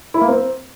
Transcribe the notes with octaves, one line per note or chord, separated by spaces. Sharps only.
E4
A#3
C4